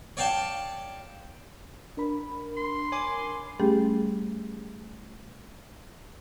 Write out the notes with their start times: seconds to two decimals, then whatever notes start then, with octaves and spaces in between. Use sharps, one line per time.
0.17 C#5 D5 F5 G5 A5
1.97 D4 A#4 B5
2.57 C6
2.92 C#5 G#5 D6
3.60 G3 A3 C#4 G4 G#4